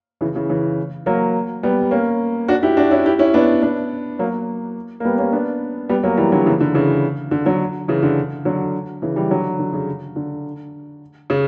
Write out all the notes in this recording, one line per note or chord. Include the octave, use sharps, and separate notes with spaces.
C#3 E3
C#3 E3
C#3 E3
F#3 A#3
G3 B3
A#3 C#4
D4 F#4
E4 G4
D4 F#4
C#4 E4
E4 G4
C#4 E4
B3 D4
B3 D4
F#3 A#3
A#3
G3 B3
A#3 C#4
B3 D4
G3 B3
F#3 A#3
E3 G3
D3 F#3
C#3 E3
D3
C#3 E3
D3
D3 F#3
C#3 E3
D3
D3 F#3
C#3 E3
E3 G3
D3 F#3
D3
C#3
D3
C#3